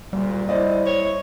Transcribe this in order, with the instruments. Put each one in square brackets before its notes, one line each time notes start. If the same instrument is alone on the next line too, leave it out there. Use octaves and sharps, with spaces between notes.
[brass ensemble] D2 A#2 [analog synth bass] G3
[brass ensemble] E4 [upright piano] C5 D5 D#5
[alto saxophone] C#5